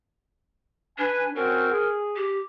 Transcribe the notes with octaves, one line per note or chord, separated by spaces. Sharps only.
D4 B4 G#5
C4 C#4 F#4 A#4
G#4
G4